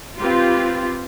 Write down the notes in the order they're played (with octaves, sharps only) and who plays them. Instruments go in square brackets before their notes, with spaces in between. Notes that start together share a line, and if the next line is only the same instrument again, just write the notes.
[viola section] C4 G4 B4 [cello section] F4